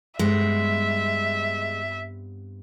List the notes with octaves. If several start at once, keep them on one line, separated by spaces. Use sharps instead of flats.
G2 G#3 B3 C4 E5